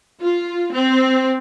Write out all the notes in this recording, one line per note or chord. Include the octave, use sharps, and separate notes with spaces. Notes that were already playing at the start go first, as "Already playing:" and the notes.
F4
C4